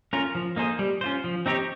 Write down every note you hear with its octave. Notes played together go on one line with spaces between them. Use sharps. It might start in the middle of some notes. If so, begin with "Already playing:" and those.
C#4 F4 A#4
F3
A#3 D#4 G#4 C5
G3
C#4 F4 C5
F3
C4 D#4 G4 C#5